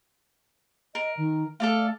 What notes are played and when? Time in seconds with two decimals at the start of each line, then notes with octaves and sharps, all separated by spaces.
0.95 A#4 D#5
1.17 D#3
1.60 A3 A4 D5 F5